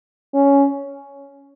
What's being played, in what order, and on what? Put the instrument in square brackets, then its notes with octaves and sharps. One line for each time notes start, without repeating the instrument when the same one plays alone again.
[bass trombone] C#4